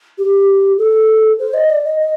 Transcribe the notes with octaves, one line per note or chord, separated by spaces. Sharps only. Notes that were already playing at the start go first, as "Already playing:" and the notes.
G4
A4
C5
D#5
D5
D#5
D#5